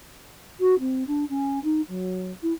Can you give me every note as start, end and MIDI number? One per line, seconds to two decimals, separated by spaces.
0.60 0.78 66
0.80 1.04 60
1.07 1.25 62
1.29 1.62 61
1.64 1.81 63
1.88 2.32 54
2.43 2.53 64